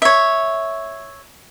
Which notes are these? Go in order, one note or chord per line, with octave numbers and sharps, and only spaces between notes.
C#5 E5